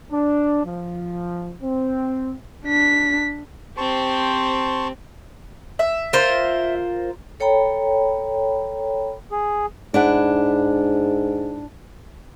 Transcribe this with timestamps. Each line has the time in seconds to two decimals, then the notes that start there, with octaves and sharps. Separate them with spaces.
0.11 D4
0.64 F3
1.62 C4
2.65 D4 B6
3.77 C4 G4 C5 A5 C6 C#6
5.79 E5
6.13 F4 A#4 C5
7.40 A4 C#5 G5 A#5 B5
9.32 G#4
9.94 G#2 D4 E4 F#5